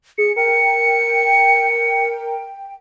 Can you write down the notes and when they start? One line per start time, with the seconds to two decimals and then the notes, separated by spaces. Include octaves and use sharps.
0.18 G#4 C#7
0.36 A#4 G5 C#7